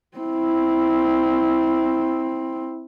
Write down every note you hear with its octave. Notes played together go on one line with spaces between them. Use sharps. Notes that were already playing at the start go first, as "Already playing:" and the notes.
C4 E4